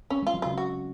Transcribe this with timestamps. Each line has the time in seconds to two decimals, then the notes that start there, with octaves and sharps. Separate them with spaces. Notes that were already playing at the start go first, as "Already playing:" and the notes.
0.10 C4 C#4
0.23 G#3 F4
0.34 F#3
0.42 C#3 F4
0.58 F#4